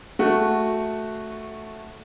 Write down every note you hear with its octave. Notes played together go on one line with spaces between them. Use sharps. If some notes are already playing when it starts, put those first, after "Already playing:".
A3 F#4